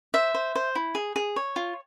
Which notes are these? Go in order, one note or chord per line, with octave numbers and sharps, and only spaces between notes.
C5 E5
C5
C5
E4
G#4
G#4
C#5
F4